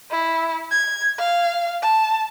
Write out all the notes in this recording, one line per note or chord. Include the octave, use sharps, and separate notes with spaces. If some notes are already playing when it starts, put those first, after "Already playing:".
E4
G#6
F5
A5